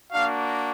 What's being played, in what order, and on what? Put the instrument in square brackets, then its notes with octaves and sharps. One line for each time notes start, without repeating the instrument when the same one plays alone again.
[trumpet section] A#3 D4 F#4 F5